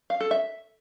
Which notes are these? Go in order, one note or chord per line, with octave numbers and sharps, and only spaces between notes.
F5
A4
E5